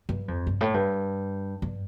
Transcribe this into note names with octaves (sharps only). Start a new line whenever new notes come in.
G2
F2
G2
A2
G2
G2